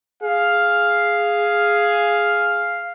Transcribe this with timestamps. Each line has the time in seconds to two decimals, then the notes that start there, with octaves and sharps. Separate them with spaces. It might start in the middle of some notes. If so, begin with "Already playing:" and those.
0.23 G#4 F5